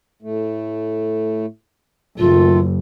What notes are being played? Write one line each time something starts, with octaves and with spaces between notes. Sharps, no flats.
A2 A3
F#1 D#3 A3 F4 A4